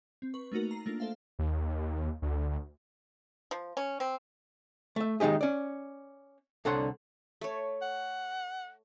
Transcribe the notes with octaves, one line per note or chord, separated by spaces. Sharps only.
C4
B4 C#6
A3 A#3 D#4 F#4 A#4
A#5 C7
A3 A#3 D4 F4
A4 C5 E5 F5
D#2
D2
F3
C#4
C4
A3 E5
D#3 G#3 D#4 G4 G#4
C#4 D5
C2 D3 A4 C#5 F#5 C6
A3 C#5
F#5